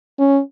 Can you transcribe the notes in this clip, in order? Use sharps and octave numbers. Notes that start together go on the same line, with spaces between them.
C#4